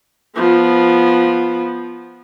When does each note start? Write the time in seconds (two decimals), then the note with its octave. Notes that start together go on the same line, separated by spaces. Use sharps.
0.36 F3 B3